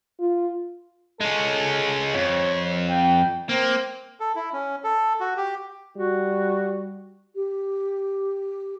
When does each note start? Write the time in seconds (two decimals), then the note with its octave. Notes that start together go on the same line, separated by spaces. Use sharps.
0.20 F4
1.20 G#3 C#4 A4
2.14 F2 C#5
2.90 G5
3.49 A#3 C4
4.20 A4
4.36 E4
4.53 C#4
4.84 A4
5.20 F#4
5.37 G4
5.97 G3 F#4
7.35 G4